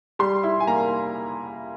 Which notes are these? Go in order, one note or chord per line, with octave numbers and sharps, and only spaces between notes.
G3 C6
E4
G#5
A#3 A#5